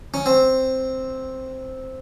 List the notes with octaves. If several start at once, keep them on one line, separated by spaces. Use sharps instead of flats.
C#4
C4